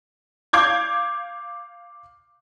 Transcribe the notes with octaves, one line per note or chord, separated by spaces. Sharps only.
F5 D6 G6 G#6